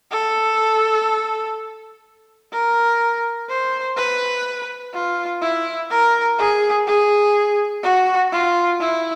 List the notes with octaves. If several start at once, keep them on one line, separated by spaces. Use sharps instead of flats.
A4
A#4
C5
B4
F4
E4
A#4
G#4
G#4
F#4
F4
E4